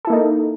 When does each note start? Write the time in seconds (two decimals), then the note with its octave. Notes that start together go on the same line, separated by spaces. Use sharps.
0.05 A4
0.07 E4
0.10 A#3
0.12 D#4